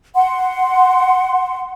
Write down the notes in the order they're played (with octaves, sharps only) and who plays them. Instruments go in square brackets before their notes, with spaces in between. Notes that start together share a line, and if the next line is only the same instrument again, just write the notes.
[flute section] F#5 C6